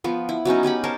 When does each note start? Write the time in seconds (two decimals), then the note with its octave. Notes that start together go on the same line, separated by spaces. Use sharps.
0.04 F3 B3
0.29 E4
0.45 F#3 B3 C#4 D#4
0.63 B3 C#4 G4 B5
0.84 A#4 C5 C#5 A5